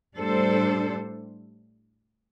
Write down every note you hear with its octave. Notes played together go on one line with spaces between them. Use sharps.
A2 G3 D4 A4 C5